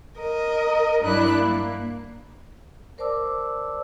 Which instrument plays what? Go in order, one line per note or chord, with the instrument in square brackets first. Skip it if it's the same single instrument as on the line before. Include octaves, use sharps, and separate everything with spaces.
[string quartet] A#4 D#5
G2 F#3 D4 E4 F#6
A#3
[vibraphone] A#4 C5 D5 A5 D6 E6